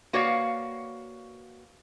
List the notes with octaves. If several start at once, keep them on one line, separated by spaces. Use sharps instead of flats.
A#3 F#4 B4 C#5 D5 F5